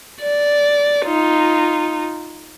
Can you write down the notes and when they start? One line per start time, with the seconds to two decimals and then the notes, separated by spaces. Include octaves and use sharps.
0.21 D5
1.06 D#4 F4